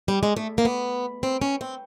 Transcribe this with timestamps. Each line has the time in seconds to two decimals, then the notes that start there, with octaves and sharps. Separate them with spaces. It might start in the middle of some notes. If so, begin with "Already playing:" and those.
0.08 G3
0.23 G#3
0.37 A3
0.58 A#3
0.65 B3
1.23 C4
1.42 C#4
1.61 C4